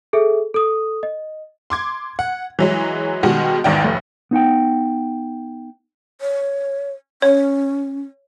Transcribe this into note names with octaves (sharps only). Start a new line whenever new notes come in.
G#4 A4 E5
A4 D#6
D#5
C6 D6 G#6
F#5
E3 F#3 G#3
B2 D#3 G3 G#3 F#4
G#1 E2 G#2 D#3 D5 G5
F1 A2
B3 D#4 F#5 G5
C#5
C#4 C#5